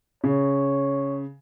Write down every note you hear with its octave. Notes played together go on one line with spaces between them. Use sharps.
C#3 C#5